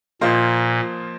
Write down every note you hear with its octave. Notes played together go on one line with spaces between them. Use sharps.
A#2 F3 A#3 F4 C5 D#5